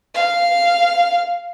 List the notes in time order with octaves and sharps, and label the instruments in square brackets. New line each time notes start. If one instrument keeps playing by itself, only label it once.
[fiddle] F5